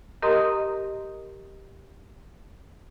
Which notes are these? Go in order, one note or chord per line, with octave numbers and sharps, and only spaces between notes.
G4 A#4 D#5 A#5 C6 D#6